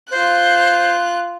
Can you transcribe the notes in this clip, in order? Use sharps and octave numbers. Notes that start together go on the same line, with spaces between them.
F4 C5 F#6